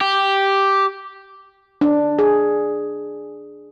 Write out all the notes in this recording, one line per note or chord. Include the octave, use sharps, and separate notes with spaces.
G4
D4
G#4